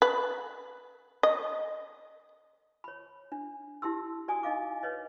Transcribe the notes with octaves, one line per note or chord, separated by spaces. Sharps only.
B4
D#5
C#5 B5
D4
E4 G4 C6 E6
F#4 D5 G#5 D#6
D#4 D#5 F5 D6
B4 C#5 D#5